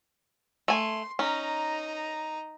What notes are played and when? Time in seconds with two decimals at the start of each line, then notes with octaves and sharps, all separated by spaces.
0.68 A3 G#5 C6
1.19 C#4 D#4 A#5